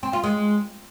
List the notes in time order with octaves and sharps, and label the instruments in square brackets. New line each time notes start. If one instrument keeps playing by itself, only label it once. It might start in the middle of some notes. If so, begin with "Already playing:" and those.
[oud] C4
F4
G#3